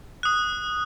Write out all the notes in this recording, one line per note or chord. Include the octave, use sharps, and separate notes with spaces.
D#6 F#6